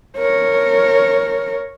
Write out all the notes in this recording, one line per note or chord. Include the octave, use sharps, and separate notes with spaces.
A#4 C#5